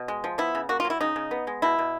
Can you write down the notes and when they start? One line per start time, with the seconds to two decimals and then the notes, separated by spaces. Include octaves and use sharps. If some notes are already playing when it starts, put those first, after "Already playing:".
Already playing: B2
0.08 G#3
0.24 F3
0.38 B3 E4
0.55 C#3
0.69 A#3 F#4
0.80 F4
0.85 F#3
0.90 E4
1.01 C#3 D#4
1.16 C#3
1.31 B3
1.47 G#3
1.62 B2 E4
1.79 B2